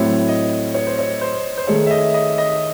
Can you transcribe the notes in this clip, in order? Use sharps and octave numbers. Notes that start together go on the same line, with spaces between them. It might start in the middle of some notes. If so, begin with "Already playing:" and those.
Already playing: A2 F#3 C4 E4 C#5
D#5
C#5
C5
C#5
C5
C5
D#3 A3 D#4 G#4 C#5
E5
D#5
D#5
D#5